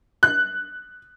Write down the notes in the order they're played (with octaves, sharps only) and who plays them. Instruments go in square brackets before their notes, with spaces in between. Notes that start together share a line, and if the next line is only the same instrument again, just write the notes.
[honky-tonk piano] F#6